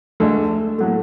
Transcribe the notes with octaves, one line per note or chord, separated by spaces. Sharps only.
D2 D3 G#3 A3 A4
A2 F#3 A3